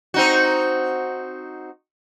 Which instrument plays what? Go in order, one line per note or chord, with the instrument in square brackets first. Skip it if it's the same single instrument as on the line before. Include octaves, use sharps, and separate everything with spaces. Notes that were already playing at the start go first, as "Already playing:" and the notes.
[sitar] C4 D#4 F#4